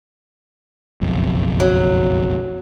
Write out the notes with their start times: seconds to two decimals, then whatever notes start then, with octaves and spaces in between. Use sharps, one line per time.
1.01 F#1 B1 F2
1.60 F#3